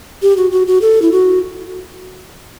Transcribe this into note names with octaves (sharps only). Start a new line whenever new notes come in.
G4
F#4
F#4
F#4
A4
E4
F#4